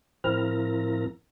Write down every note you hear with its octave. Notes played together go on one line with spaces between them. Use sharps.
A2 F3 C4 E4 A#4 A#5